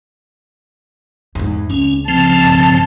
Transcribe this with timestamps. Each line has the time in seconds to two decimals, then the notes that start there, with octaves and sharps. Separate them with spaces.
1.35 E2 G#2
1.70 C#2 C#4
2.08 C#3 F3 C4 A5
2.44 B1 G2